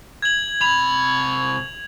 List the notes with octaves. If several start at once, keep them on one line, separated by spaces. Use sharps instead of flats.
G#6 F#7
C3 B5 F7